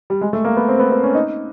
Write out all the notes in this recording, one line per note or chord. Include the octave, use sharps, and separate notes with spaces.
G3
G#3
A3
A#3
B3
C4
B3
B3
C#4
D#4